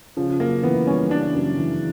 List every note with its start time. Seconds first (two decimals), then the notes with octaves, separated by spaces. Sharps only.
0.17 C#3 F3
0.40 F#2 A#3
0.63 E3 B3
0.87 G3 C#4
1.11 C#3 D4
1.34 F#2
1.58 E3